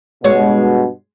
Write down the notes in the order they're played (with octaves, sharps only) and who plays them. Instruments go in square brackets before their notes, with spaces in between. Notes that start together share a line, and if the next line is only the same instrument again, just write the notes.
[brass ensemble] G2 B2 [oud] G#3 C#5